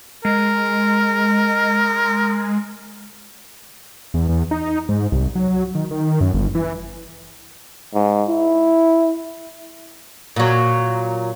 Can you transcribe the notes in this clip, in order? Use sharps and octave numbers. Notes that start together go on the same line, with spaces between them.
G#3 A#4
E2
E2
D#4
G#2
C2
F#3
D#3
D#3
F#2
G1
E3
G#2
E4
A#2 F#3